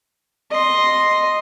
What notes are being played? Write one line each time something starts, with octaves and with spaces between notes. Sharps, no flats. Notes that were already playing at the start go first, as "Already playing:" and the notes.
D#5 C6